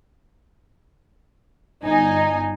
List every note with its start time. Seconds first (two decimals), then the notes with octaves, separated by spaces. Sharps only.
1.84 G1 D#4 G#5